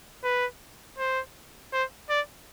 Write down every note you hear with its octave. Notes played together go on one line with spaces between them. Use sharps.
B4
C5
C5
D5